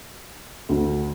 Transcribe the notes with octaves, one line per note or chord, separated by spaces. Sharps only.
D2